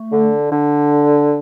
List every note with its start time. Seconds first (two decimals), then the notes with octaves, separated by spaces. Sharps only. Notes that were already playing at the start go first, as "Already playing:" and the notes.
Already playing: A3
0.12 D3
0.51 D3